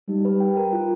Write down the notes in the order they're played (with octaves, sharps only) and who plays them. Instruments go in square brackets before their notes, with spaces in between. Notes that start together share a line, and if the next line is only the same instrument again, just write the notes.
[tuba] G3 [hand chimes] D#4
[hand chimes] B4
G5
A#4
F4